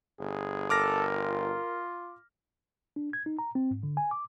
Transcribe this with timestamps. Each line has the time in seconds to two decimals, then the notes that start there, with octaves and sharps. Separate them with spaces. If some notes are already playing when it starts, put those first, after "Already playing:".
0.19 G1 G#4
0.70 A4 A#4 D6 F6 A#6
1.15 F4
2.96 D4
3.13 G#6
3.26 D#4
3.39 A#5
3.55 C4
3.71 G#2
3.83 D3
3.97 G#5
4.11 D6